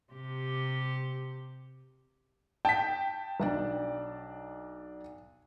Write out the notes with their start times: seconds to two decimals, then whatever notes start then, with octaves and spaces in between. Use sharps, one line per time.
0.12 C3 G4
2.65 G5 A5 B6
3.40 B1 D4 D5